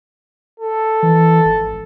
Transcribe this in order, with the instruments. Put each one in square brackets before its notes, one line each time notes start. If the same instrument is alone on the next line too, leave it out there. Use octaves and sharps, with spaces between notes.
[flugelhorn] A4
[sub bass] E3
G#1